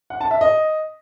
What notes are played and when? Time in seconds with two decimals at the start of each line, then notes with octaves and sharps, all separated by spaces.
0.10 F#5
0.21 A5
0.31 E5
0.41 D#5